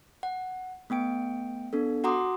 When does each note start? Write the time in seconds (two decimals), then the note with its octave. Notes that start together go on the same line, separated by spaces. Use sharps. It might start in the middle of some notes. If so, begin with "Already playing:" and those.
0.23 F#5
0.90 A3 B3 G5 D7
1.73 B3 D4 A4
2.04 F#4 F#5 A#5 C6 D6 D#6